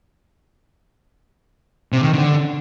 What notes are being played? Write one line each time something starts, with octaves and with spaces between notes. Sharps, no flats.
C3
D#3
D3